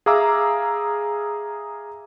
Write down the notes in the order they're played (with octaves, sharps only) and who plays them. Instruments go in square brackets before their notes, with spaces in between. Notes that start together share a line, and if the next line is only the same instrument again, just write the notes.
[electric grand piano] G#4 E5 F5 A#5 D6 E6